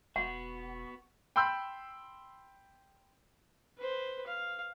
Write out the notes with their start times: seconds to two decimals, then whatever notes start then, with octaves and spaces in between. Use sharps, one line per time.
0.16 E1 B3 F#4 F#5
1.36 G5 B5 C6 E6 G6
3.78 B4 C5
4.27 F5